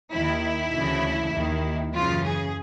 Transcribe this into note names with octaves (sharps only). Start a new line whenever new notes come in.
D#2 D#3 E4
D2 C#3 E3
D#2 D#3
F#2 C#3 E3 F4
G#4